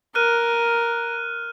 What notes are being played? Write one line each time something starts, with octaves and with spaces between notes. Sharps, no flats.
A#4 F6 F#6 D#7